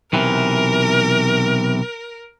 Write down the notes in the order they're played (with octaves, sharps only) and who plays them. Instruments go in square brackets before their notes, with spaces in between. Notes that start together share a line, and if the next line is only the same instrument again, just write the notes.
[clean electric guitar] B1 C3 E3 [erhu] A#4